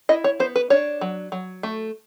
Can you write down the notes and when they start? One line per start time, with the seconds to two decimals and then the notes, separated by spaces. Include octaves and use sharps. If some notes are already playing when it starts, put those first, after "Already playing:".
0.09 E4 D#5
0.24 C#5
0.40 B3 C5
0.56 B4
0.70 D4 C#5
1.01 F#3
1.32 F#3
1.63 A3